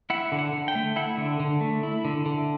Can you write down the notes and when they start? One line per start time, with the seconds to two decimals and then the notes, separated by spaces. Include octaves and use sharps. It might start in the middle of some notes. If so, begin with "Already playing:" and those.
0.10 E4 F#5
0.32 D3
0.39 F#5
0.53 D3
0.68 G5
0.75 A3
0.96 E4 F#5
1.17 D3
1.40 D3
1.61 A3
1.83 E4
2.05 D3
2.26 D3